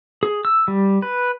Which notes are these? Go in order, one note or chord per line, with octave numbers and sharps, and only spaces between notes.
G#4
E6
G3
B4